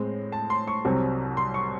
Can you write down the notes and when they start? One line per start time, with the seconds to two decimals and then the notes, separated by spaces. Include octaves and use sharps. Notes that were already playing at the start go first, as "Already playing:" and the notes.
Already playing: A2 G#3 C4
0.32 A5
0.50 C6
0.67 C#6
0.85 C2 C3 F#3 C4
1.37 C6
1.54 C#6